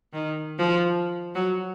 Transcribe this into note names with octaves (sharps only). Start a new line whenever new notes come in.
D#3
F3
F#3